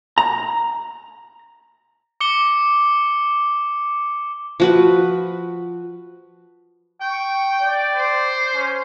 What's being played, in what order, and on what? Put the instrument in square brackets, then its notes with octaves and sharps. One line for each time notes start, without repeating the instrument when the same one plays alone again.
[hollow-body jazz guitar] A#5
[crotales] D6 C#7 G7
[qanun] F3 F#4 B4
[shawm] G5 [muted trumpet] C#6
[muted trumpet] D5
[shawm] C5
[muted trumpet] C#4